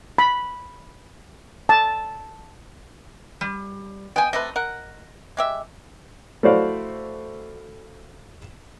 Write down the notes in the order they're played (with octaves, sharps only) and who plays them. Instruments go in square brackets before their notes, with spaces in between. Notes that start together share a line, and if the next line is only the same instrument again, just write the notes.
[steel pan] B5
A5
[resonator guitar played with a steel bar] G3
[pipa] B3 D#5 [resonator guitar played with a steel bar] G5 G#5
[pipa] C3 A3 B4 [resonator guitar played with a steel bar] D#5
[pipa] A#4 F#5
G#3 G4 E5
[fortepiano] A3 E4 F#4 C5 D5 F5